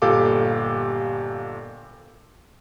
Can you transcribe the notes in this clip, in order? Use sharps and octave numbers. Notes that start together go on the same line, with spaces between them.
G1 A#2 G4 A4 F5 D6